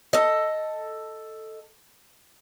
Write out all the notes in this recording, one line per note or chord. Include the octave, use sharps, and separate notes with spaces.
A4 D#5